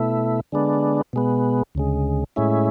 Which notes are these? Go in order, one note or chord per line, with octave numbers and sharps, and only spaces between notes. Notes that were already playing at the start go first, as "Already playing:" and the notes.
Already playing: B2 A3 E4
D3 G#3 B3 D4
B2 G#3 B3
D2 C#3 G#3
A2 G#3 C#4 E4